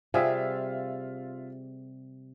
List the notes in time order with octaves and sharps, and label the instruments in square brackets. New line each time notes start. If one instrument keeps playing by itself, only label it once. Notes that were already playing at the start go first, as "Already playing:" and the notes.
[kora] C3 G3 G#4 [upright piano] F4 E5